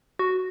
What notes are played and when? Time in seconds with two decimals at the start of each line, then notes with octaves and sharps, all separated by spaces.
0.19 F#4